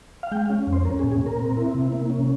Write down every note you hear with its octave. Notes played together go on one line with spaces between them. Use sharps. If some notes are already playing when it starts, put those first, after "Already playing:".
F5
G#3 G5
F5
C#4
F2
C5
C#4 A#4
G#4
A#2
G#4
A#2
A#4
C4
E4
C3
A#3
C#4